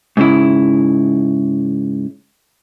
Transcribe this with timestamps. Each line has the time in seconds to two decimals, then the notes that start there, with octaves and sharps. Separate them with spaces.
0.17 G#2 C#3 E4